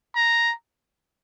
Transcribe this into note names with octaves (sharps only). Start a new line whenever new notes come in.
A#5